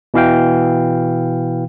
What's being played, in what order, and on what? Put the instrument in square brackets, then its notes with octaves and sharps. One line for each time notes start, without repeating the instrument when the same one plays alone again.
[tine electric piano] B2 E3 F5 G5